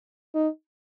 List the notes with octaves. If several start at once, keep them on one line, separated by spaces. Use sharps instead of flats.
D#4